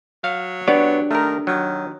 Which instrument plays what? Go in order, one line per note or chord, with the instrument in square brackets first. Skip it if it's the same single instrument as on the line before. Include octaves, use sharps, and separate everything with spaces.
[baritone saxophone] F#3 [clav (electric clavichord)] F5
[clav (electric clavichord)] B3 C#5 [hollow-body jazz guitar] D4 G4 D5
[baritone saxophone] D#3 [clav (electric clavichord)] A3 A#4
[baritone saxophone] D#3 [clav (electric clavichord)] F#3